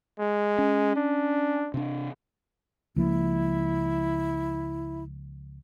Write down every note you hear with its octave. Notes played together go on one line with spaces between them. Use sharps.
G#3
C#4
D4
C3 D4
C#2 F3 A#3 E4